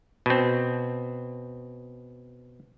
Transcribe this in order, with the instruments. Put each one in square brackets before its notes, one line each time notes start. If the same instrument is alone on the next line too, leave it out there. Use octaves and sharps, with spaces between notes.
[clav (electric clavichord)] B2 C4